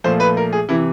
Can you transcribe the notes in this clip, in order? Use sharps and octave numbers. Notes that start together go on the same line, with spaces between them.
A#2 F3 A3 C5
B4
A#4
G#4
C3 E3 E4